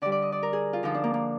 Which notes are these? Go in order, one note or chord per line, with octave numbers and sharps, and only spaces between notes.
D3 G3 D5
D5
D#5
D5
A#4
G#4
F4
D3 F3 D#4
D4
A#3
A#3